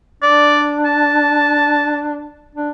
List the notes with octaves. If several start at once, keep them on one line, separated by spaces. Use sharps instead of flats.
D4 D5
A5
D4